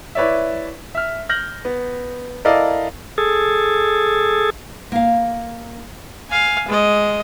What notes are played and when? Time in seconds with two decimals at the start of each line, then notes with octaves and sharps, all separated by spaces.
0.15 E4 B4 C#5 D5 E5
0.95 E5 F6
1.29 F6 G6 A#6 F#7
1.65 B3
2.45 E4 A4 A#4 D5 D#5 F5
3.18 G#4 A4
4.92 A#3 F5
6.30 F5 G#5
6.68 G#3 D#5